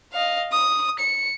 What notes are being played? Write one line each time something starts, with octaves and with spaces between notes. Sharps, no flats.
D#5 F5
D#6
C#7